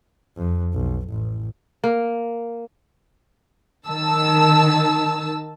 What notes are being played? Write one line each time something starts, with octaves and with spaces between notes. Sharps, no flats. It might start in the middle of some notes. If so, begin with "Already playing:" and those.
F2
B1
A1
A#3
D#3 A5 E6